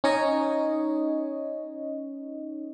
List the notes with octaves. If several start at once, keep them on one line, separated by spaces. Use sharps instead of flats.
C#4 D#4 C#5 D#5